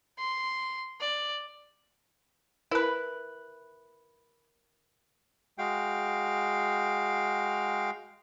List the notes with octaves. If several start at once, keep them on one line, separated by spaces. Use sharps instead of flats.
C6
D5
E4 A#4 B4
G#3 F#4 F5 G5